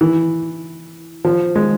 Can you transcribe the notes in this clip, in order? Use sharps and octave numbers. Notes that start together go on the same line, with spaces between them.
E3
F3
G#3